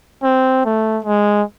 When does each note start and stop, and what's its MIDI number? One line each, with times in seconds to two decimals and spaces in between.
0.23 0.61 60
0.65 0.99 57
1.05 1.42 56